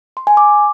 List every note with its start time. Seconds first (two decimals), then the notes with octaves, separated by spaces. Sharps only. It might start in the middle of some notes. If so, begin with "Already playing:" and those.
0.17 C6
0.27 G#5
0.37 D6